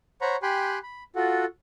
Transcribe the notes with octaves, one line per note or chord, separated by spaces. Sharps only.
C5 C#5 F#5 A#5 B5 C#6
G4 G5 G#5 B5 C6 F#6
B5
F4 F#4 A4 F#5